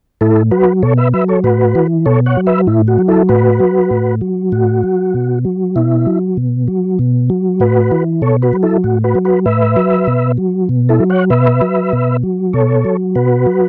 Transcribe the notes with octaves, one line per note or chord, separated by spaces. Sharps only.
A2 E4 A4
F#3 F#4 B4
B2 A4 C#5
B4 E5
F#3 B4 E5
A4 C#5
A2 F#4 B4
E3
B2 A4 C#5
C#5 F#5
F#3
B4 E5
A2 E4
F#4
F#3
E4 A4
A2 F#4 B4
F#3
A2
F#3
A2 F#4
F#3
B2
F#3
B2 E4
F#3
B2
F#3
B2
F#3
A2 F#4 B4
E3
B2 A4 C#5
F#4 B4
F#3
E4 A4
A2 F#4
F#4 B4
F#3
F#4 B4
A2 B4 E5
F#3
B2
F#3
B2
E4 A4
F#3
C#5 F#5
B2 B4 E5
F#3
B2
F#3
B2 A4 C#5
F#3
B2 F#4 B4
F#3